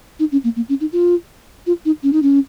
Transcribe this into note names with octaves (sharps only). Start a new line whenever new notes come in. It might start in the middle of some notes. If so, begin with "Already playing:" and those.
D#4
C#4
A#3
A#3
C#4
D#4
F4
F4
D#4
C#4
D#4
C#4